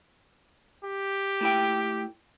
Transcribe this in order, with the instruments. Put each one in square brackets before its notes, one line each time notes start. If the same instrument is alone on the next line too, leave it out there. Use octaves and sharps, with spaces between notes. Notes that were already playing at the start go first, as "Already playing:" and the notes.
[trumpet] G4
[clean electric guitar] A3 E4 G5